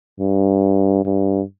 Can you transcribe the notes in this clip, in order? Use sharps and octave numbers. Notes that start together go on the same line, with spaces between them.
G2
G2